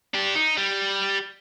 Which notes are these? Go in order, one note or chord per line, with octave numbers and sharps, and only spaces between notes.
D4 G4
D#4
G3